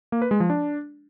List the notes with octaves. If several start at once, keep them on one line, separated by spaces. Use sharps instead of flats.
A#3
B4
G#3
F3
D4